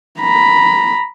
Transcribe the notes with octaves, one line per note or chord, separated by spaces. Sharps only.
A#5 B5